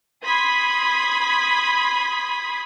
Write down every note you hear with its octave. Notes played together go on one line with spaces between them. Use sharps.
B5 C6 D#6 G#6 B6